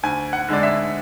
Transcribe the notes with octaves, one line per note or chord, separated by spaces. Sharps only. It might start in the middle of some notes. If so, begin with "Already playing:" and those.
D2 G#5
F#5
D3 G#3 D5
E5